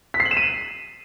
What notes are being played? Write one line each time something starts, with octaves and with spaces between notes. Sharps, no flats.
B6
C7
F#7
E7
D#7